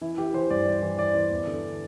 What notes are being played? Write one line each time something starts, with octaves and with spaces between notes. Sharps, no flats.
E3 E4
E3 G4
E3 C5
G2 D5
E3
E3
E3 D5
E3
E2
D3